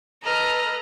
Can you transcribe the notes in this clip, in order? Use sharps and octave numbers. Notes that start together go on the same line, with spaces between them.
A4 B4 D#5 A#5 F6